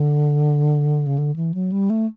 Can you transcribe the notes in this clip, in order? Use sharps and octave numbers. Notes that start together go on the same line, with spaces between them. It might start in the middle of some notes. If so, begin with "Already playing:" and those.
Already playing: D3
C#3
D3
E3
F#3
G3
A3